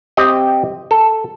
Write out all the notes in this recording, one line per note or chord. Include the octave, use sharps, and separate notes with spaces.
C4 G4 D#5
A4